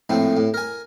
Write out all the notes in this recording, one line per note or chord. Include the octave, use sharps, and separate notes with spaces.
A#1 A2 A3 C4
A2
A#4 G#5